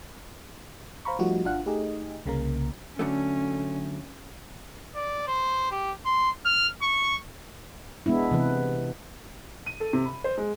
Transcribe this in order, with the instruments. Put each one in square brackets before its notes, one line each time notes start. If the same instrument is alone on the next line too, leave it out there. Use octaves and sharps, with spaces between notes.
[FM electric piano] C5 F5 A#5 B5 C#6
F3 G3 A3 D#4 F4 F#4
G#1 D4 F4 F5 F#5 F#6
A3 D#4 G4 G#4 D#5
C2 C#3 A#3 A#4
[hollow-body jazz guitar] D3 F#3 A3 [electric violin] C#4
[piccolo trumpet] D5
C5
G4
C6
F6
C#6
[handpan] G#3 B3 D4 E4
C3 E3 B4
[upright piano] D#7
A4
C3
B5
C5
G#3